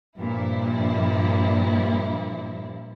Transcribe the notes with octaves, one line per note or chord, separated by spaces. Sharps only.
G2 A#2 F3 E4